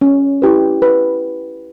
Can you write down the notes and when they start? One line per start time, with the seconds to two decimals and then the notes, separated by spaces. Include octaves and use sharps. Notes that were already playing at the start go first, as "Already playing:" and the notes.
0.01 C#4
0.42 E4 G4 B4
0.82 B4